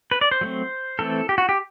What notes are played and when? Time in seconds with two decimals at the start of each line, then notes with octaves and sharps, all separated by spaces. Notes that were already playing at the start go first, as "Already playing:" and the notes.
0.11 B4
0.21 D5
0.31 C5
0.41 F#3 A3 C4
0.99 E3 A3 C4 A4
1.29 G4
1.38 F#4
1.49 G4